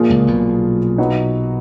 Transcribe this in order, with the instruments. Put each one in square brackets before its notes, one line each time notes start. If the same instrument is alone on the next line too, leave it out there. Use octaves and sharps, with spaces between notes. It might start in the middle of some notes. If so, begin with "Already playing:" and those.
Already playing: [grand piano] A#2 F3 A#3 F4 G#4
[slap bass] C#2 C#3
B1 B2
[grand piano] F#3 B3 D#4